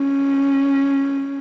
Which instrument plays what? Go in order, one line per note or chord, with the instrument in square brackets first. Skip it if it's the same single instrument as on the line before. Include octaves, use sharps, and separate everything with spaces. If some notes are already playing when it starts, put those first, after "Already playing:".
Already playing: [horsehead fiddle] C#4